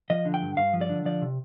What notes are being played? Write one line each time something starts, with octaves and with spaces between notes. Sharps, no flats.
F3 D#5
D3
G5
G2
G2 F5
F3
D5
D3
F3 D5
C3